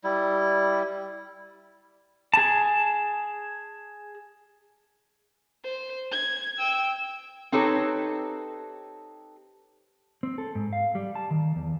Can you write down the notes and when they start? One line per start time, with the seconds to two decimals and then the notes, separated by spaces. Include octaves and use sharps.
0.04 G3 E4
2.34 G#4 A5
5.64 C5
6.12 G#6
6.59 G5 E6
7.52 C4 D#4 G4 A4 B4 C#5
10.23 C4
10.38 A4
10.55 G#2
10.73 F5
10.95 G3
11.15 A5
11.31 D#3
11.56 E2